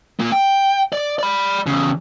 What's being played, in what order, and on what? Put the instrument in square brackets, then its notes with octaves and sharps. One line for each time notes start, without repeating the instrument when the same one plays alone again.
[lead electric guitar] A#2 A#3
G5
D5
D5 B5
E2 C#3